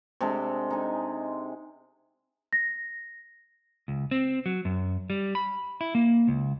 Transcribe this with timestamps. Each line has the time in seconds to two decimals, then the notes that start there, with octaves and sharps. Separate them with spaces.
0.21 C3 G#3 D4 A4
0.70 D#4 G#5
2.53 A#6
3.88 C#2
4.11 C4
4.46 F#3
4.65 F#2
5.10 G3
5.35 B5
5.81 E4
5.95 A#3
6.28 C#2